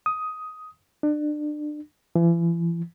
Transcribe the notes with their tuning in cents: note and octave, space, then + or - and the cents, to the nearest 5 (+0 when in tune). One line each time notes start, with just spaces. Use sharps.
D#6 +10
D4 +30
E3 +40